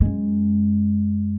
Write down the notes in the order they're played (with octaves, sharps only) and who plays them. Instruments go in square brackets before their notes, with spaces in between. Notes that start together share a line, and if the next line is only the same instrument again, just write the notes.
[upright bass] F#2 G#3